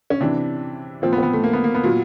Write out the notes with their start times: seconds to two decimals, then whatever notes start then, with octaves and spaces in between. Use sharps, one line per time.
0.10 C#4
0.20 C3 E3 D4
1.02 A#2 F3 C4
1.13 B3
1.18 C4
1.23 B3
1.33 A3
1.44 A#3
1.53 B3
1.64 A#3
1.74 B3
1.84 A#2 F#3